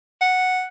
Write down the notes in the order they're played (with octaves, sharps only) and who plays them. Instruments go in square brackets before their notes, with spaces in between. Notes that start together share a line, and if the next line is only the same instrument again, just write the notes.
[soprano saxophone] F#5